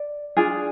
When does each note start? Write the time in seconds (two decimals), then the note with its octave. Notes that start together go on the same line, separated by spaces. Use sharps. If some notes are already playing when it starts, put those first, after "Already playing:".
Already playing: D5
0.37 D4 F4 G#4